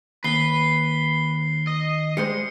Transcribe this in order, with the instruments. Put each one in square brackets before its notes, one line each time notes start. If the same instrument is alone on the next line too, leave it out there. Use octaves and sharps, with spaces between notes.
[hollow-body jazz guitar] D#2 [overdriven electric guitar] B4 [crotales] C7 G7
[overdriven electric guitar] D#5
[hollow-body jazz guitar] G3 G#3 C5 [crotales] C#7